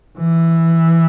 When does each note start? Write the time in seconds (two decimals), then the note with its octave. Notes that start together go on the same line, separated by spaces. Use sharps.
0.19 E3